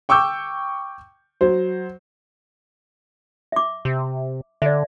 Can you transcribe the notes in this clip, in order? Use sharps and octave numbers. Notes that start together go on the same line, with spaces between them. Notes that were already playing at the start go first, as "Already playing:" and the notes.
G5 C#6 D6 E6 G6
F#3 C5
E5 D6
C3
D3 D5 E5